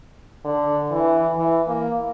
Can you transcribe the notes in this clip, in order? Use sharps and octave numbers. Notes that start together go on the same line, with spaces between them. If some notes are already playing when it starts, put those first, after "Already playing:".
D3
E3
E3
A#3